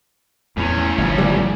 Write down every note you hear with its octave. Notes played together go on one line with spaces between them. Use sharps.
E2 A2 C#4
G1 G2 F3
C#2 G3